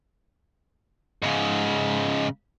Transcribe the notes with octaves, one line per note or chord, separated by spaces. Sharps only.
G#2 C#3